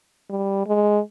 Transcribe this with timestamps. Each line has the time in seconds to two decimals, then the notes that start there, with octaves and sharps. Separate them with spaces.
0.30 G3
0.67 G#3